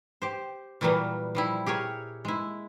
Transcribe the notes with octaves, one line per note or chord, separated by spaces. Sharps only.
G4 C5
A#2 E3 F#3 G3 A#3 B3
F3 G3 E4
G4 G#4 A#4 C#5
G#3 E4